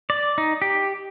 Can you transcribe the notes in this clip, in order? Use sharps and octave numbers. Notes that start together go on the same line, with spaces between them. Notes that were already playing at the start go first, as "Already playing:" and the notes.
D5
D#4
G4